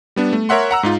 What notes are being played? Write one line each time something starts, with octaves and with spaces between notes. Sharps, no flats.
G3 B3 D4
A3
A#4 C#5 E5 F#5 C6
F#5 A#5 E6
G#2 D#4 F4